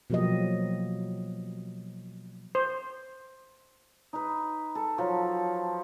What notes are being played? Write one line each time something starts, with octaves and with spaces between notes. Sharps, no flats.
B2 F3 F#3 A#3 G4 D#5
C5
D#4 B4
A4
F3 F#3